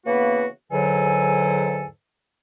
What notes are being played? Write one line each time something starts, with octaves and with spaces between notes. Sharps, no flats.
C#3 E3 A#3 B3 F#4 B4
E2 G#2 D3 F#3 A4 G#5